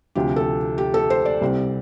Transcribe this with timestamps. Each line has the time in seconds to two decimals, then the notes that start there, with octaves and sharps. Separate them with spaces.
0.15 D2 C3 F3 G4
0.36 A4
0.78 G4
0.94 A4
1.10 C5
1.25 D5
1.41 C2 C3 G3 C4